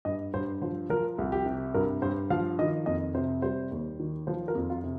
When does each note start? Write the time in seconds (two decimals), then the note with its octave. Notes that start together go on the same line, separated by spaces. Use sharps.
0.05 G2 D#5
0.34 G2 C5
0.62 F3 C5
0.90 F3 A#4
1.18 C2
1.32 G4
1.46 C3
1.74 G2 A#4
2.02 G2 C5
2.30 F3 F5
2.59 D#3 D#5
2.86 F2 D#5
3.15 C3 C5
3.42 G3 C5
3.71 D#2
4.00 D#3
4.27 F3 C5
4.48 A#4
4.55 F2
4.70 F4
4.84 C3